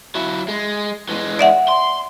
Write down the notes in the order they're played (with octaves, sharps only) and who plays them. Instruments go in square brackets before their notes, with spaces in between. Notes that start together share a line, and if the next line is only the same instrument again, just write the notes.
[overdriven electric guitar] F#3 E4
G#3
E3 G#3
[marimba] D5 E5 F#5
[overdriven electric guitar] C6